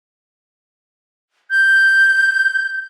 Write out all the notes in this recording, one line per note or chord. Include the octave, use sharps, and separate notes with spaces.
G6